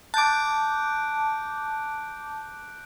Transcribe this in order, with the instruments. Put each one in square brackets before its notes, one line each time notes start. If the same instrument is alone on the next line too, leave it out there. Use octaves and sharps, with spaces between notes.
[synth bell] A5 D6 [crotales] F#6 G6 D7